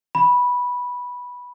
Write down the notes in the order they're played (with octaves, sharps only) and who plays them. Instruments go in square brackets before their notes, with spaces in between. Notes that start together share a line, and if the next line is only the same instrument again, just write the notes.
[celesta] B5